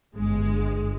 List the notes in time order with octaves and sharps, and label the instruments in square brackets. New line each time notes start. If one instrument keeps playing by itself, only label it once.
[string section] G1 G#3